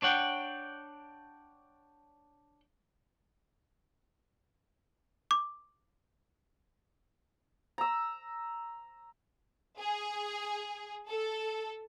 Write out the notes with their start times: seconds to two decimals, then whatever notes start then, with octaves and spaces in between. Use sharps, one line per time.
0.02 D4 C#5 F#5 G5
5.31 D6
7.78 A#5 E6
9.77 G#4
11.07 A4